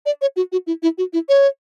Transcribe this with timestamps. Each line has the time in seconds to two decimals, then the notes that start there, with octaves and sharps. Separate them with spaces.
0.06 D5
0.21 C#5
0.36 F#4
0.52 F#4
0.67 E4
0.83 E4
0.98 F#4
1.13 E4
1.29 C#5